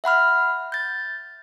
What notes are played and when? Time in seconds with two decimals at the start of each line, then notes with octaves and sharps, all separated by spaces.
0.04 E5 F#5 B5 F6
0.72 G6 A6